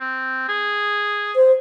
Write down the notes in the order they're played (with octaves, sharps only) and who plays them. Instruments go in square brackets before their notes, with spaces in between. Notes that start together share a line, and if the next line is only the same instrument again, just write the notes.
[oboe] C4
G#4
[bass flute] C5